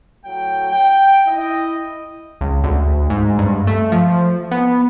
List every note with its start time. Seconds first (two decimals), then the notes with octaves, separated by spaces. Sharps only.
0.25 A2 F#3 G5
0.72 G5
1.27 E4 D#5
2.41 C#2
2.64 D2
3.10 G#2
3.39 G2
3.67 A3
3.92 F3
4.51 B3